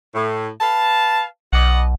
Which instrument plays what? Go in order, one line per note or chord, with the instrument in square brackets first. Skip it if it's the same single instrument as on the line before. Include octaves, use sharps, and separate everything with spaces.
[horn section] A2
B4 F5 A5
[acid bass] B1 [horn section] D5 D#5 F#5